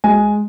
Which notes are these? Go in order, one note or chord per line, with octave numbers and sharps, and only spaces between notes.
G#3 G#5